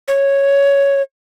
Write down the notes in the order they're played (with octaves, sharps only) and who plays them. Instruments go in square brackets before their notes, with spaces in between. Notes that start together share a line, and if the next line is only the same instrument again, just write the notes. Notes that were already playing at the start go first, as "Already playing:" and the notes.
[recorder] C#5